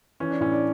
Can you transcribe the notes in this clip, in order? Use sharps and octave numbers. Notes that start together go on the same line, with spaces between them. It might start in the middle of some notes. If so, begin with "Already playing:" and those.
E3 C#4
D4
A2 C#4
D4